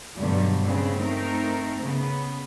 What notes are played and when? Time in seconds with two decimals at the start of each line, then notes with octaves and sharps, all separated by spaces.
0.17 G2 B2 D3 F#3
0.63 C#3 B3 C4
0.99 A3 C4 D#4 A#4
1.83 C#3 B3